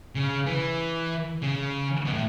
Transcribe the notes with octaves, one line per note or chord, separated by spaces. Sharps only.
C#3
E3
C#3
B2
A2